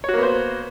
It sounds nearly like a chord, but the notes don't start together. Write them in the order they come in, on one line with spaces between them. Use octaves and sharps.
C#5 F#4 A#3 B3 C5